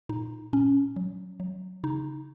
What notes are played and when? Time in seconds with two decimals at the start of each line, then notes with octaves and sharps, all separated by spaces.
0.09 A#2 D#4
0.53 A#2 C#4
0.96 F#3
1.40 F#3
1.84 C#3 D#4